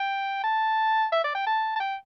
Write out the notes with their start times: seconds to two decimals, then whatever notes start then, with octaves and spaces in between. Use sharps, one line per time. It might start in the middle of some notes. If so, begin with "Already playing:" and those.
Already playing: G5
0.44 A5
1.12 E5
1.24 D5
1.35 G5
1.47 A5
1.76 A5
1.80 G5